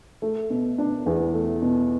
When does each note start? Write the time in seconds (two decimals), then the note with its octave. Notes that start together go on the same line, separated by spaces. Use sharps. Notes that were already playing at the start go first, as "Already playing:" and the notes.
0.22 A3
0.50 B2
0.78 D4
1.06 E2
1.33 A3
1.62 B2